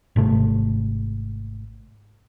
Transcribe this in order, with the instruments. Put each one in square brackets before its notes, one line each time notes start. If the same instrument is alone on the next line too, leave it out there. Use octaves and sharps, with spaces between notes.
[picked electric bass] G#1 C3 A3